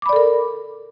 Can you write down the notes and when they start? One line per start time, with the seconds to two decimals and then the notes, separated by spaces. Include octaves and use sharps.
0.02 D6
0.06 B5
0.09 D5
0.13 A4
0.16 A#4